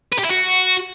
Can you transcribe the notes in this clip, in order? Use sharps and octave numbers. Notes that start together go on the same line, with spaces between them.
B4
G4
E4
F#4